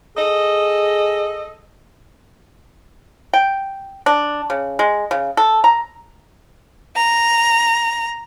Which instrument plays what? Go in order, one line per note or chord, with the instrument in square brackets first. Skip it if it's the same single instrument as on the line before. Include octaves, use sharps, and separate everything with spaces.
[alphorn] G#4 [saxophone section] A4 D#5
[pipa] G5
D4
C#3
G#3
C#3
A4
A#5
[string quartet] A#5